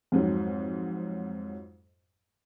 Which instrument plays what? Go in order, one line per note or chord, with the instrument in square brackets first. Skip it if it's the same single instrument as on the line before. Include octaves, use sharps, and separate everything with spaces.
[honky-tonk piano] F2 G#2 F#3